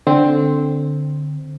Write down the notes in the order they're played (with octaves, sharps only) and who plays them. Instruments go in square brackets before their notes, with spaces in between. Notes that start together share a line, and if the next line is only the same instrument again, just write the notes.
[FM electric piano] D3 C4